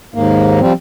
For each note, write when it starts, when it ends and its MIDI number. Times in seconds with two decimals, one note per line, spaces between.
0.14 0.60 39
0.14 0.60 44
0.14 0.60 58
0.61 0.73 53
0.61 0.73 55
0.61 0.73 60